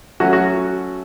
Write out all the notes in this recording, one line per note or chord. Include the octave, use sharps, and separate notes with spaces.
F#3 A3 C#4 F#4
F#4